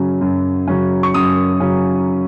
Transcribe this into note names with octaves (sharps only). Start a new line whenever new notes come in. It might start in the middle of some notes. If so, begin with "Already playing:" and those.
Already playing: F#2 C#3 F#3 C#4
F#2
C#3 F#3 C#4
C#6
F#2 D#6
C#3 F#3 C#4